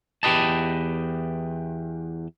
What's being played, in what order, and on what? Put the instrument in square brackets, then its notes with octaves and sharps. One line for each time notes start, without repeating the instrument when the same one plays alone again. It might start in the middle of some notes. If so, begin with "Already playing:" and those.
[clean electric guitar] E2 G4 B4 D#5 A5